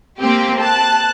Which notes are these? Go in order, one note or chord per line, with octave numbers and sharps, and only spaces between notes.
A#3 C4 G4
A5 F#6